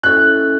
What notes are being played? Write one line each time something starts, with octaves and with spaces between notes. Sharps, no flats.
C#4 E4 A4 E5 F#6